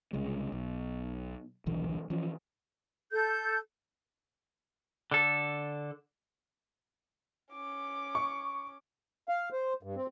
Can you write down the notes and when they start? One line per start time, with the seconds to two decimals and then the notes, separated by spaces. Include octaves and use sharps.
0.13 C2 C#3 G#3
0.52 B1
1.66 D#1 B1 D3 E3
2.10 E3 F3 C#4
3.12 A4 G6
5.11 D3 A4
7.53 C#4 D6
8.15 C#6
9.29 F5
9.52 C5
9.83 G2
9.96 C4